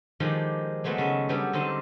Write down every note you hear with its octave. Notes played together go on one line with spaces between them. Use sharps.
D#3 F3 G#3 G4 A4
F#3 G#3 A3 B3 A5
C#3 D#5 E5
F#3 G3 B3 D4
D3 C4 D#4 D#5 A5